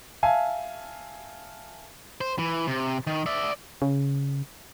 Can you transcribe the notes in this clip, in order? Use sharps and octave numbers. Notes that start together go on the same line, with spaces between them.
E5 F5 G#5 A5
C5
E3
C3
D#3
D5 E5
C#3